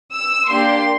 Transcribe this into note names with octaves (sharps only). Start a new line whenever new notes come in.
E6
A#3 D4 G4 C6